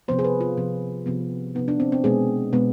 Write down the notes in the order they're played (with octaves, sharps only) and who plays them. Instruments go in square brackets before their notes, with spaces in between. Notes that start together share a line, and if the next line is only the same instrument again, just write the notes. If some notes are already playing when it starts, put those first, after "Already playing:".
[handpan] C3 F3 B3 C5
G#4
B4
F4
C3 F3 B3
C3 F3 B3
C3 F3 B3 D#4
D4
C4
C4
B2 G#3 B3 G#4
B2 G#3 B3